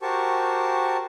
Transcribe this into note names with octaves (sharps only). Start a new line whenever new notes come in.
F#4 G4 A#4 C5 A5 C#6